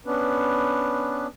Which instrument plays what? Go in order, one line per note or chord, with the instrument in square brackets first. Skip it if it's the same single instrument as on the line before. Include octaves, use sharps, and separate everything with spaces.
[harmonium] B3 C#4 D4 B4